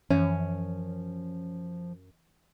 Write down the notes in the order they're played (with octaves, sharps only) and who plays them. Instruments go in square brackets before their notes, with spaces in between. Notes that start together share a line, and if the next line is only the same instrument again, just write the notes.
[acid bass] F#2 [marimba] E3 [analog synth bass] F3 [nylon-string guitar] C#4